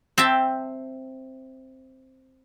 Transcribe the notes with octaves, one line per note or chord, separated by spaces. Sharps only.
C4 E5 G5 A5